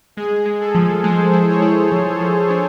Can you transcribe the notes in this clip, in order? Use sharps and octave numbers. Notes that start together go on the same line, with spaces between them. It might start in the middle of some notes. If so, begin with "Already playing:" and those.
G#3 G#4
G#3
A4
F3
G#3 C5
E4
C#5
E4
F3
F3
D4